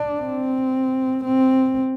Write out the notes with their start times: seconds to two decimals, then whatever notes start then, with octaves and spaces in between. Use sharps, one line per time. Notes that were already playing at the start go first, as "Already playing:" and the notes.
Already playing: D4
0.21 C4
1.24 C4